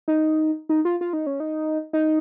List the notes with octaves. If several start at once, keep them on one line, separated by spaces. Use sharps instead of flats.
D#4
D#4
F4
F4
D#4
C#4
D#4
D#4